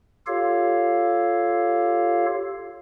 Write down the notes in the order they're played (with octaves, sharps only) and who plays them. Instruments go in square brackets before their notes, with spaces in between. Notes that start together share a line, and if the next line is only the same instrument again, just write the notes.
[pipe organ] F4 G4 A4 C#5 F5